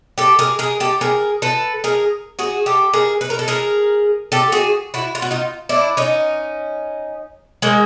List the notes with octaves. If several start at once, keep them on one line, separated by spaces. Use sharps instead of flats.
G4 A4
G#4 A#4
G#4 A#4
G4 A4
G#4 A#4
A4 B4
G#4 A#4
F#4 G#4
G4 A4
G#4 A#4
B4
A#4
A4
G#4 A#4
G4 A4
F#4 G#4
E4 F#4
F4
F#4
D#4 F4
D4 E4
C#4 D#4
G#3 A#3